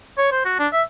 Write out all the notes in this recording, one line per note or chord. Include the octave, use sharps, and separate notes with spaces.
C#5
C5
F#4
D4
E5